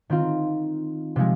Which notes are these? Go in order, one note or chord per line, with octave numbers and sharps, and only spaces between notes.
D#3 C4 F4
C3 F3 G#3